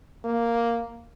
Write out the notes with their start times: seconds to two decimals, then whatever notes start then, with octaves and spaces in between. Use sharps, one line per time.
0.25 A#3